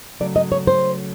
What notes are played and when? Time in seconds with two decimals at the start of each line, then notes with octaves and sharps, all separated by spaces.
0.20 C#3 F#3 A3 D5
0.36 D#5
0.52 C#5
0.67 C5